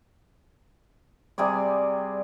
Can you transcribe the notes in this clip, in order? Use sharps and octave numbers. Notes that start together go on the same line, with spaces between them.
C3 G3 G#4 D5